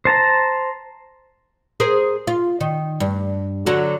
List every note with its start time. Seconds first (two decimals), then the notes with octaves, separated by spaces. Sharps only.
0.05 C5 A5 A#5
1.80 G#4 A#4 C5
2.27 F4
2.61 D#3
3.00 G2
3.66 D3 F#3 F#4